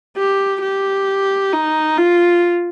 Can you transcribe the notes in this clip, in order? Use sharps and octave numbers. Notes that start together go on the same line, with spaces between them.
G4
G4
D#4
F4